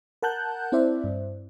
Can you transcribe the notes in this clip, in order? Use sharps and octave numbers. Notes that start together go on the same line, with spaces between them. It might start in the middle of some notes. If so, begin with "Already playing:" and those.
A#4 F#5 A5 F#6 G6
C4 E4 C5 D5 E5
G2